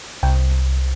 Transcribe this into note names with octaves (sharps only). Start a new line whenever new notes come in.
C2 G5